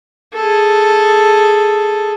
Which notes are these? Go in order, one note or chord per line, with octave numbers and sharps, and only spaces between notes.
G#4 A4